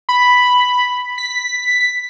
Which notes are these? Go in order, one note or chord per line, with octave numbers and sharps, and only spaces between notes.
B5
B6